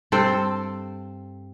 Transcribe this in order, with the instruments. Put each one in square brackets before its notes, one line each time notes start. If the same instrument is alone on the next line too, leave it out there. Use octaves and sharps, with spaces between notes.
[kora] G2 C4 A4 C5